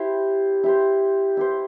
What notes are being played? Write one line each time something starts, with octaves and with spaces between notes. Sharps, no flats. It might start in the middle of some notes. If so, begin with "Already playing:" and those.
Already playing: E4 G4 C5
E4 G4 C5
E4 G4 C5